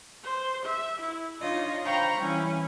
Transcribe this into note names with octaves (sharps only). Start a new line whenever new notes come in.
C5
E5
E4
D4 D#4 F4 C#5 D#5
C5 F5 G5 A#5 B5 C#6
E3 G3 C#4 E4